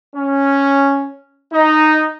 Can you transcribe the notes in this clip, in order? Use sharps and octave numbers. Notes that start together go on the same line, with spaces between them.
C#4
D#4